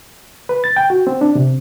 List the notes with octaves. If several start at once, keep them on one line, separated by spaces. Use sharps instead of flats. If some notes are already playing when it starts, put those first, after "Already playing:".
B4
A6
G5
F#4
C4
D4
C3